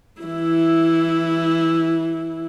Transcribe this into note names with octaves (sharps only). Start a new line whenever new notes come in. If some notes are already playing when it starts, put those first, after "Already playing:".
E3 E4